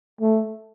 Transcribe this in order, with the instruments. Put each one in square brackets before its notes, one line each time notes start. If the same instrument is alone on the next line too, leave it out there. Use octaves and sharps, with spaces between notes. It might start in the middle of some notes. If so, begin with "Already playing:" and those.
[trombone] A3